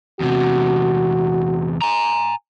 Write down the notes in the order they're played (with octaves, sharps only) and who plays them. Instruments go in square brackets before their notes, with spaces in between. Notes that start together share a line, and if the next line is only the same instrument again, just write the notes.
[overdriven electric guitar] E2 C3 [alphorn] F#4
[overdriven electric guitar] G#5 A#5